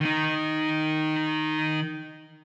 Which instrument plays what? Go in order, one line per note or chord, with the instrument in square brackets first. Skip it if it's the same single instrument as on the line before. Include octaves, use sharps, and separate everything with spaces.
[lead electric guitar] D#3 D#4